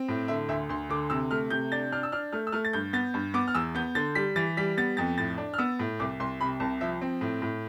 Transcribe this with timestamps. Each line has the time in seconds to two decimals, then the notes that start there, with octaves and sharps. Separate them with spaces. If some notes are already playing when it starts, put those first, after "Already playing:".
Already playing: C4
0.09 A2
0.28 D3 E5
0.49 D2 E5
0.69 D2 C6
0.89 D3 D6
1.10 C3 E6
1.31 A3 F6
1.50 C3 G6
1.72 D4 A6
1.92 D4 F6
2.03 E6
2.12 D4 F6
2.32 A3 F6
2.47 E6
2.52 A3 F6
2.65 A6
2.73 G2 G6
2.93 B3 A6
3.14 G2
3.34 B3 D6
3.48 F6
3.54 E2 E6
3.75 B3 G6
3.95 D3 A6
4.15 G3 B6
4.36 E3 A6
4.57 G3 B6
4.77 B3 A6
4.97 F2 A6
5.18 A2 A6
5.38 D4
5.54 F6
5.58 B3 E6
5.79 A2
6.00 C2 D6
6.20 C2 C6
6.41 C3 B5
6.60 C2 A5
6.81 F3 E5
7.01 C4
7.21 A2
7.42 A2